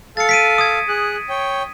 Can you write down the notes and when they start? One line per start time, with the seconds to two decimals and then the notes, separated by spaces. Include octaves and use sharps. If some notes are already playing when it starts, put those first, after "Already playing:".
0.17 A4 F5 A6 C#7
0.29 B6 D7 D#7
0.58 D#6 G#6
0.88 G#4 F#6
1.29 C#5 G5